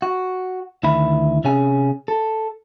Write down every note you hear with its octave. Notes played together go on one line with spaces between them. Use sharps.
F#4
D2 D#3 E4 B5
C3 C#4 G#4 G#5
A4